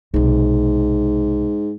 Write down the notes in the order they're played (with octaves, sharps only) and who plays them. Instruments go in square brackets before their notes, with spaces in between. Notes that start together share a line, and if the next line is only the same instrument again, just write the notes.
[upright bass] B1 C3 [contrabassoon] G#2